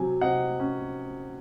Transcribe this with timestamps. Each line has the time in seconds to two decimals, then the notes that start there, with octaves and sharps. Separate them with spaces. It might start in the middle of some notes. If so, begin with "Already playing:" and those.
Already playing: C3 F#3 G#5
0.21 C3 D#5 F#5
0.60 C#4